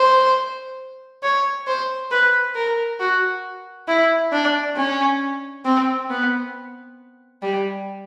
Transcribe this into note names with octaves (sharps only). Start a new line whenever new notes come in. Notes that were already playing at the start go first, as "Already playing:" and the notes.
Already playing: C5
C#5
C5
B4
A#4
F#4
E4
D4
C#4
C4
B3
G3